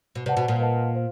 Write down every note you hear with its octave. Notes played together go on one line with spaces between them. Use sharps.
B2
C3 B4 D5 F#5 A5
B2
A#2
B4 D#5 F#5 A5
C5 F5